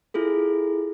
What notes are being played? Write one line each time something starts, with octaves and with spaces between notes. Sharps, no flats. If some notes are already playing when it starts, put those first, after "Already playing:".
E4 F4 G#4 A4